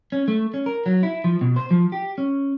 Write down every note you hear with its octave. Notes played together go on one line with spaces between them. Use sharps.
C#4
A3
C#4
A#4
F#3
E4
F3
B2
C5
F3
G4
C#4